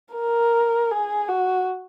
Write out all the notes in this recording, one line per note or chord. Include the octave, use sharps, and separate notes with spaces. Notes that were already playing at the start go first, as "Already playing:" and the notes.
A#4
G#4
F#4